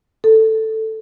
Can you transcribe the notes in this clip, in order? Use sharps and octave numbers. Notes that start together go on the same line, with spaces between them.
A4